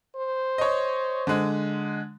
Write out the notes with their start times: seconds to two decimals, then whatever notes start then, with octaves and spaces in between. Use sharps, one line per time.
0.16 C5
0.58 C#5 D#5
1.27 D3 G#3